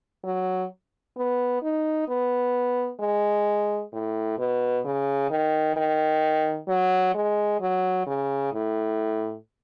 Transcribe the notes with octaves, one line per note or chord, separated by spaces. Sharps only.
F#3
B3
D#4
B3
G#3
A2
B2
C#3
D#3
D#3
F#3
G#3
F#3
C#3
A2